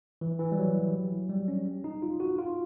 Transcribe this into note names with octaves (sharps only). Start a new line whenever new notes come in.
E3
E3
G3
F#3
G3
C#4
D#4
F4
F#4
F4